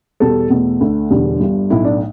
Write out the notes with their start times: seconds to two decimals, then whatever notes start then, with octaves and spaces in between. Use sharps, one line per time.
0.20 E2 B2 G3 A4
0.50 E2 B2 A3
0.80 D2 D3 A3
1.10 E1 E2 D3 G3
1.40 G1 G2 G3
1.70 B1 A2 A3 E4
1.85 D4